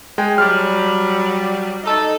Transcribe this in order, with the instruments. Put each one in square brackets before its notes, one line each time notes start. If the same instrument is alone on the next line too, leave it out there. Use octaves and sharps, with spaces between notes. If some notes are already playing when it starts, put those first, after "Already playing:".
[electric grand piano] G#3 G5 G#5
[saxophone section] F#3 G3 [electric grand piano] F6
[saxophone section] D#4 A4